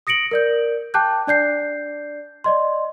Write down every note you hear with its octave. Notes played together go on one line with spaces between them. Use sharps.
D#6 A#6 C#7 D7 F#7
A#4 D5 G6
G5 A5 D6 F#6 G6
D4 D5 G6 C7
D5 D#5 C6